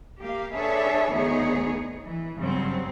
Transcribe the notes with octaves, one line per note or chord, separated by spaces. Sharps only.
A#3 G4 F5
D4 G#4 A4 B4 C#5 E5
D2 D#3 B3 D#4 G#4 C#5
E3
G2 C#3 F#3 C4